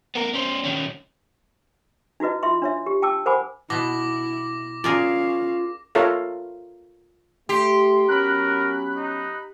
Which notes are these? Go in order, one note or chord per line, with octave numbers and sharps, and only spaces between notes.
B3 A#4
C#4 C5
D#3 C#4
D#4 E4 F#4 B4 D#5
F4 E5 C6
D4 C#5 E5
G4
G5 A5 D6 E6
A#4 C5 F#5 G#5 B5 D6
B2 B3 E4 D6 A#6
C#4 F4 G#4 A#4 D5 F5
F4 A4 A#4 C#5 E5 F5
A3 G4 C6
F#3 B3 C#4 A#4 B5 F#6
D#4